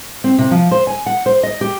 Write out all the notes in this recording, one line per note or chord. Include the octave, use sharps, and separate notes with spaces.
C4
C3
F3
C5
G#5
F#5
C5
D#5
G4